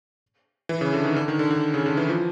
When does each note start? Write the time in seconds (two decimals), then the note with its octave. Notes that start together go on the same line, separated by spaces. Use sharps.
0.69 E3
0.81 C#3
0.93 D3
1.04 D#3
1.16 D3
1.28 D#3
1.39 D3
1.51 D3
1.74 C#3
1.86 D3
1.97 E3
2.09 F3